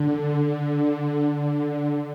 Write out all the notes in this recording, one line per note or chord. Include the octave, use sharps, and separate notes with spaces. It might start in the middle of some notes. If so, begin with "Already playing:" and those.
Already playing: D3
D3